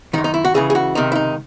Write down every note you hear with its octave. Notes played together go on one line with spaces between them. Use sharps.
F#2 D#3 D#4
D#4
E4
F#4
C#2 C#3 E3 G#4
G#4
F#4
C#2 C3 D#3 D#4
E4
D#4